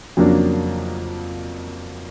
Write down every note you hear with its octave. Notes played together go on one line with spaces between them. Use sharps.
F2 C#3 F#3 A#3 D4